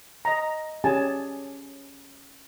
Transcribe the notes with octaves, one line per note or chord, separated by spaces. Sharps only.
D#5 A#5
C#4 G4 G#4 G#5 A5